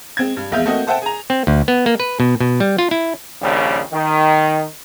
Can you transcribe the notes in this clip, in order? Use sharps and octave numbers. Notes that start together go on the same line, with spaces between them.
G#3 C4 G#6
G2
A#1 E2 G#3 E5 F5 G6
A3 A#3 C4 F#4 D#5
A4 C5 E5 F#5 G5 A5
G#4 A#5
C4
D2
B3
A#3
B4
B2
B2
G3
F4
E4
A#1 D#2 C#3 G3
D#3